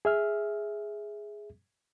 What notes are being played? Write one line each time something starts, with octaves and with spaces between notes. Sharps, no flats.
G#4 E5 F6